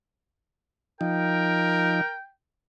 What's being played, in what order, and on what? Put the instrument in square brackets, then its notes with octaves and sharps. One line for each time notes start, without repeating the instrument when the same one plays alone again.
[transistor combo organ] F3 D#4 [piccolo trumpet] A#4 [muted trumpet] G5